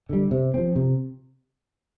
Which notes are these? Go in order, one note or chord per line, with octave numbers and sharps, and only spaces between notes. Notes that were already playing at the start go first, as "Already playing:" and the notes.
D3 G3
C3
F3 C4
C3